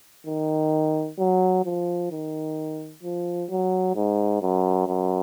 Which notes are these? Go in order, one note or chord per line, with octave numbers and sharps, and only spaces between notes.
D#3
F#3
F3
D#3
F3
F#3
G#2
F#2
F#2